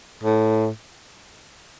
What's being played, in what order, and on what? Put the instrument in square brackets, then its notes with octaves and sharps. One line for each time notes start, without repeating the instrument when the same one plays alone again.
[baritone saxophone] A2